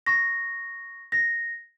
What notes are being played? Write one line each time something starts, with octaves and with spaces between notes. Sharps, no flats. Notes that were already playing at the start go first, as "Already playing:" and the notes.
C#6 A#6
A#6